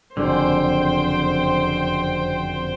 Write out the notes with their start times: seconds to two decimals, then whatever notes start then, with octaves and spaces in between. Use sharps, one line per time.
0.17 F#1 F2 D3 C5 G5